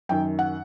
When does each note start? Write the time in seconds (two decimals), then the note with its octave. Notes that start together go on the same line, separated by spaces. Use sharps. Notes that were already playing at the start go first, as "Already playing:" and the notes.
0.09 F#2 D#3 G5
0.39 F#5